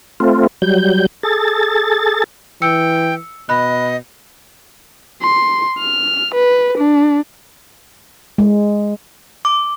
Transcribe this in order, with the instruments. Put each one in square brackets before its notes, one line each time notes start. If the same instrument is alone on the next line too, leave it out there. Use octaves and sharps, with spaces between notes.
[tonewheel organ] A3 C4 F4
F#3 G3 G6
G#4 A4 A6
[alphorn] E3 [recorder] G5 [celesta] E6 C#7
[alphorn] B2 [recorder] D#5 [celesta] B5 F#6
[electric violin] C6
F6
B4
D4
[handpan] G#3
[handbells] D6